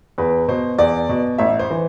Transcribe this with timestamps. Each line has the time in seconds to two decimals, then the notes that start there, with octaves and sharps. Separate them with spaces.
0.18 E2 B4
0.48 B2 C5
0.78 E2 D5
1.09 B2
1.38 A1 E5
1.59 C5
1.70 E3